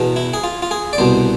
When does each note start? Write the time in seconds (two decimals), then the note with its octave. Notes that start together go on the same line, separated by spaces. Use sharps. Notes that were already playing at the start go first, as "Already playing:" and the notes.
Already playing: E2 B2
0.16 E4
0.34 G#4
0.44 F4
0.62 F4
0.71 G#4
0.93 D5
0.98 C2 B2 C5